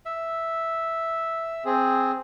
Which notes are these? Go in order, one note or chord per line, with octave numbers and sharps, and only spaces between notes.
E5
C4 G#4